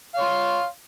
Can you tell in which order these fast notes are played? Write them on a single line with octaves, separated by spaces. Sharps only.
F5 C#5 C6